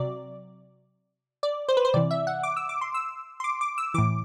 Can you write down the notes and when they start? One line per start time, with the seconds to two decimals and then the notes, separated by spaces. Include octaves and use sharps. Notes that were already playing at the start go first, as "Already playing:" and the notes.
Already playing: C3 F#3 D5
1.43 D5
1.68 C5
1.77 B4
1.85 C5
1.94 C3 E3 D5
2.11 E5
2.27 F#5
2.43 D6
2.57 E6
2.69 D6
2.81 C6
2.94 E6
3.40 C6
3.44 D6
3.61 D6
3.78 E6
3.94 A2 E3 D6